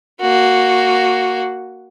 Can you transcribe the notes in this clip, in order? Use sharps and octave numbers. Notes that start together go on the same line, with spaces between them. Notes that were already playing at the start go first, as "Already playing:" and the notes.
A#3 F#4